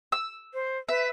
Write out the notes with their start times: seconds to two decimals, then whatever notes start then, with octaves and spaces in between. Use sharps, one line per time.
0.12 E6
0.54 C5
0.89 B4 E5